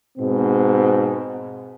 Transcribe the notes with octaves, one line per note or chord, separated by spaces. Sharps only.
G#2 B2 C4